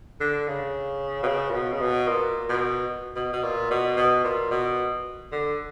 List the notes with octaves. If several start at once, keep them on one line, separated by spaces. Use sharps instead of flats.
D3
C#3
B2
C#3
A#2
B2
C#3
B2
A#2
B2
B2
B2
A#2
B2
B2
A#2
B2
D3